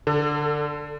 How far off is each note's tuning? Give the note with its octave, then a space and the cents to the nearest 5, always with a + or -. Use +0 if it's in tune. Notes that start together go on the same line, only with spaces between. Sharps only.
D3 +0 A4 +35